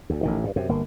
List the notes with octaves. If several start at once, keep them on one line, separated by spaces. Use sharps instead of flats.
D2
A1 A2 D#3
G2
F#2 C3
G1 A#3